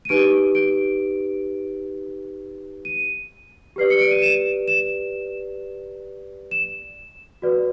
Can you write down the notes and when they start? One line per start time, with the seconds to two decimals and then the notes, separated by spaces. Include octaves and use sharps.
0.05 D#7
0.09 D#4 G4 B4 D7
0.55 D7
2.85 D#7
3.76 G4 B4 D5 C7
3.90 C#7
4.01 D7
4.11 D#7
4.22 E7
4.68 E7
6.51 E7
7.42 F#4 B4 D5